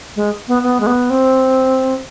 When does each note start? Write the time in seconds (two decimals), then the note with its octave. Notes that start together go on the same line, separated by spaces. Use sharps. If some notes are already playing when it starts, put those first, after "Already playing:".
0.16 G#3
0.48 B3
0.63 B3
0.80 G#3
0.87 B3
1.10 C4